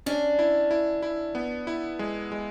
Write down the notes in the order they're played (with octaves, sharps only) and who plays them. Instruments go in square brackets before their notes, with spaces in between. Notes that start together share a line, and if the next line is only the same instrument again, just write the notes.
[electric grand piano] C#4 [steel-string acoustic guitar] D4
[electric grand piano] E4
E4
E4
B3
E4
G#3
G#3